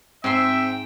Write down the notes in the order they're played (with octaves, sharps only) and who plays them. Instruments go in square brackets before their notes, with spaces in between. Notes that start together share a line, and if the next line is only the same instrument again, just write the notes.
[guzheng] G#2 C6 [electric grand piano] C4 [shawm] E5 [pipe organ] G5